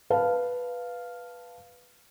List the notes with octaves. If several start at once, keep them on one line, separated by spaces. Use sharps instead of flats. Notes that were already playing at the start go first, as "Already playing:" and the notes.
B4 F5 A5